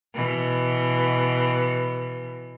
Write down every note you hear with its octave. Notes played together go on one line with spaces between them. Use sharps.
B2 E3